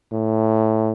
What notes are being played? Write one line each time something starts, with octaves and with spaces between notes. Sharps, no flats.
A2